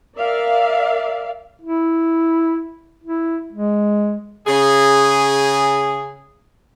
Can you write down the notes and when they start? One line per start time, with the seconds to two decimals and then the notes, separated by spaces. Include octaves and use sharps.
0.17 A#4 D5 E5 F5
1.61 E4
3.04 E4
3.52 G#3
4.46 C#3 G#4